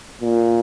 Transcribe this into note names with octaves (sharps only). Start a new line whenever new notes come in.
A#2